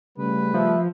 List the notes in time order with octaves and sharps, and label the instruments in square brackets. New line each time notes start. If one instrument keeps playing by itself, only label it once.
[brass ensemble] C#3 G3 A3 [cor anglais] B4
[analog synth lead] F3 [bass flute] E5